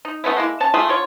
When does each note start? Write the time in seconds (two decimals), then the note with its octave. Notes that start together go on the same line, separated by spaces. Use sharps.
0.05 D#4
0.24 A3 B3 C#4 E4
0.37 G#3 A#3 E4
0.60 C#4 A5
0.74 A3 F4 G#4
0.88 D3 F4 C#5